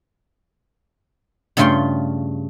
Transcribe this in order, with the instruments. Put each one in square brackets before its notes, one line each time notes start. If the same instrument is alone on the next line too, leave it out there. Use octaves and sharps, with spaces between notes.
[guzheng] G2 C#3 A3 F4 G5 C6